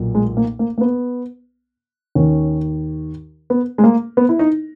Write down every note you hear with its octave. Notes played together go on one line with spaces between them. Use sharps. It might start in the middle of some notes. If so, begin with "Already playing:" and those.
Already playing: B1 A#2
G#3
A#3
A#3
A#3
B3
D#2 D#3 C#4
B3
G#3
A#3
B3
E4
D#4